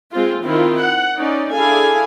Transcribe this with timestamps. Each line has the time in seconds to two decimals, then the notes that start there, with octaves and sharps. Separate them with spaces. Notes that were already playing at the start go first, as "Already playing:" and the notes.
0.12 G#3 C4 F4
0.44 D#3 C4 E4 F4
0.81 F#5
1.16 C#4 D#4 D5
1.53 D4 E4 G#4 A4 F5 G#5